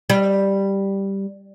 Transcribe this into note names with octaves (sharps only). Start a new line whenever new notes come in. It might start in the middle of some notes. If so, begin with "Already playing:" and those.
G3